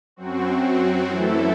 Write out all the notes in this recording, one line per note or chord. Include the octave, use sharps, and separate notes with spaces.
F#2 F#3 C4 F#4
F#2 E3 A3 E4 A4